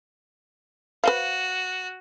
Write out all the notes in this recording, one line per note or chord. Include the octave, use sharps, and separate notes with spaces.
F#4 B4 C5 F5